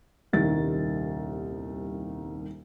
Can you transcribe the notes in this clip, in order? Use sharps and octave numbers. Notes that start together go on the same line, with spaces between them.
D#1 C2 D#3 A6